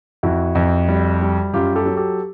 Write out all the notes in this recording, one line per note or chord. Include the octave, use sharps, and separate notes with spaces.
F2 E4 F#4
F2
G3
G3
F#2 F4 G4
G4 A4
F#3
G4 A4